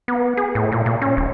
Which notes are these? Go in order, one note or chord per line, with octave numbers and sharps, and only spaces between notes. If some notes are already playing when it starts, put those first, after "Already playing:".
B3
G#4
A2
A#2
A#2
C#4
D#1